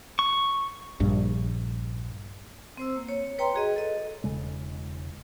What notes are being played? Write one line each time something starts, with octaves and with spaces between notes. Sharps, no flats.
C#6
A#1 G2
C4 C5 E6
A#3
C#5
B4 C#5 G5 A#5 C6
F#4 G#4 D#5
A4 D#5
E1 C#3 G#3